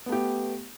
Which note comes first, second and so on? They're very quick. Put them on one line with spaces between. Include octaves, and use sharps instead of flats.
B3 A3 G4